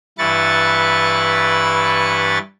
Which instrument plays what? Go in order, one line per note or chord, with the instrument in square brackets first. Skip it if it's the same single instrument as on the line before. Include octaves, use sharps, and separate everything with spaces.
[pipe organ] G2 E3 E4 B4 C#6 A6